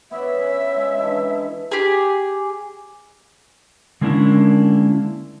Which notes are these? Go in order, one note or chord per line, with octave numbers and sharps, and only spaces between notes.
B3 C#5 D5 E5
C#4
G#3
D3 E3 D#4
G4 G#4
D3 G#3 A#3 C#4 D4 E4